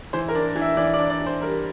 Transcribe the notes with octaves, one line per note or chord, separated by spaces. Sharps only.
E3 C5
A#4
D4
E3
E5
E3 D5
D5
D4
D5
E3
C5
G3 A#4